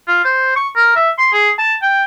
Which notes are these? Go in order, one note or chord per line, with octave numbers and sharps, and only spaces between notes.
F4
C5
C#6
A#4
E5
C6
G#4
A5
G5